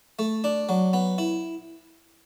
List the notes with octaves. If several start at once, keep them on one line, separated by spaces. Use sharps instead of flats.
A3
D4
F#3
B3
E4